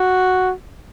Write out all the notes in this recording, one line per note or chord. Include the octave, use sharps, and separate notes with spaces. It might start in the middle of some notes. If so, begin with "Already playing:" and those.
Already playing: F#4